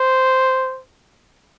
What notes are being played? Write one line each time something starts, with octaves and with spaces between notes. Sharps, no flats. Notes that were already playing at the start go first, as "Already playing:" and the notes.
Already playing: C5